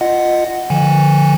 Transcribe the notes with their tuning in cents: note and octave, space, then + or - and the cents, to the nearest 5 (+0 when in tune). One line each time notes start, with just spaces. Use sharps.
F4 +0 D#5 -10 F#5 +5
D3 +0 F3 +0 G#5 -30